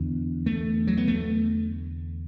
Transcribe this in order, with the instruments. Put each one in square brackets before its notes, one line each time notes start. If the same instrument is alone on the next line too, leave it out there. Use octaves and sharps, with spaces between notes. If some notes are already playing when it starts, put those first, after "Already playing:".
Already playing: [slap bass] E2 D3
A3
F#3
B3
A3